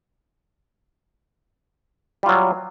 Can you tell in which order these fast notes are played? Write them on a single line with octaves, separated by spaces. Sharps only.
G3 F4 F#3